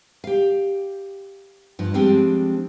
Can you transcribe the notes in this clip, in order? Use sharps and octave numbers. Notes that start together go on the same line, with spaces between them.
G4 F5
G2 F3
F3 G3 G#3 C4 D4